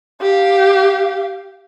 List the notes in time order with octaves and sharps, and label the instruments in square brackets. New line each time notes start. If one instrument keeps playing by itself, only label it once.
[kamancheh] G4 F5